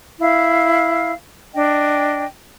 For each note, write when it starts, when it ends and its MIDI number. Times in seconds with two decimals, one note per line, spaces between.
0.19 1.11 64
0.19 1.11 77
1.54 2.25 62
1.54 2.25 75
1.54 2.25 79